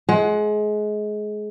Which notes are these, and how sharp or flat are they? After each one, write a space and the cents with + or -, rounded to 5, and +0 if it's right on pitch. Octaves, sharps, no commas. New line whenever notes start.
G#3 +25 F#5 +0